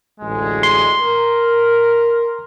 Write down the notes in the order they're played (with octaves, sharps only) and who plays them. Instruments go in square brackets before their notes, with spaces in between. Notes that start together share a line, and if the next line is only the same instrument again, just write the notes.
[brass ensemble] A1 D2 G#3
[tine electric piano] C6
[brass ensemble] A#4